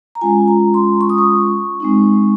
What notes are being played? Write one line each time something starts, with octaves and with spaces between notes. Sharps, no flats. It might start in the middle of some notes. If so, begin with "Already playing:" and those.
A#5
G#3 C#4 F4 G#5
A#5
C6
C#6
D#6
C#6
G#3 C4 D#4